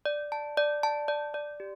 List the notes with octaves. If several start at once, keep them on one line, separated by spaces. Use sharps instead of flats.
D5
A5
D5
A5
D5
D5
G4